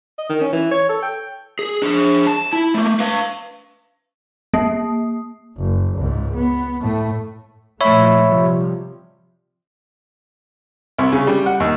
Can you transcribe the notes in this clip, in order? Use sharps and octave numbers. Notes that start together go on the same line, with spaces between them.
D#5
D#3
C#4
E3
C#5
A4
G5
G#4
D4 G#4
A5
E4
A3 A#3
B4 F5
A#3
F#1
C#2 G#2
B3
A2 A3
A#2 F3 A3 C#5 E5 B5
C3 F3 G3
C2
C#3
G3
F#5
D#2